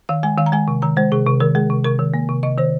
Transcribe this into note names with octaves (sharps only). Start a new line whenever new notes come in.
D#3 F5
G#3 G#5
D#3 F5
A#5
G#3 G#5
C3
D#3 A#5
G#3 C5
C3 G#4
C3
D#3 A#4
G#3 G#4
C3
C3 A#4
D#3
A#3
C3
C3 D#5
D#3 C5